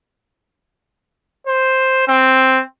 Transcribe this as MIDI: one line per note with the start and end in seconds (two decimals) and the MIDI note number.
1.47 2.06 72
2.08 2.61 60